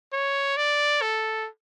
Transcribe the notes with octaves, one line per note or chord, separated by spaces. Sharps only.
C#5
D5
A4